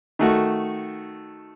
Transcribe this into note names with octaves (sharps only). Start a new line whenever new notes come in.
D#3 A3 F#4